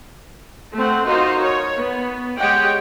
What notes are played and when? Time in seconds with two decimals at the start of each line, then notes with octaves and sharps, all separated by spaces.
0.75 A3 C4 F#5
1.06 D#4 F4 F#4 A#4 C5 D#5
1.42 C#5
1.76 B3
2.38 G#3 G4 C#5 D#5 F#5 G5